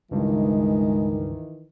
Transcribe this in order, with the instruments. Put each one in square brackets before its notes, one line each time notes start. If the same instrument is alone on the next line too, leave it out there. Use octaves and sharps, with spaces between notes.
[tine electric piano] C#2 G2 [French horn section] D#3 E3 [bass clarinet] G#3